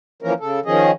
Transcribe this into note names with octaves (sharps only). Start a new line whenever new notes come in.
E3 F3 A#3 C#4 A#4
C#3 A4
D#3 F3 C#4 G#4 D#5